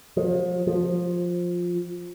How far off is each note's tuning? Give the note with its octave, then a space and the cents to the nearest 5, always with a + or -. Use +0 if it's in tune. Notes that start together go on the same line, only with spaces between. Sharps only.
F3 +35
F3 +10